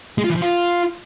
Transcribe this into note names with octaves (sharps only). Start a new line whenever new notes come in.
G#3
F4
E3
F3
F4